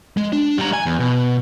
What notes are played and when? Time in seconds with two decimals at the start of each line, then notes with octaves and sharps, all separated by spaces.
0.17 G#3
0.32 D4
0.58 G3 A#5
0.73 G#5
0.86 E2
1.00 B2